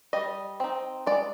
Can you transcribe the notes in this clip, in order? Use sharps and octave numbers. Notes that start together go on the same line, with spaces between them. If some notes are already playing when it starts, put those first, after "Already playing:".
G3 D#5
C4 D#4
G#3 D5